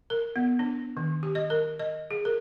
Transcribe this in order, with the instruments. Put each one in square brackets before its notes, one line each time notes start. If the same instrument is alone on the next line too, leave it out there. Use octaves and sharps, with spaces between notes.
[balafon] A#4
B3
D4
D#3
G4
D#5
A#4
D#5
G#4
A#4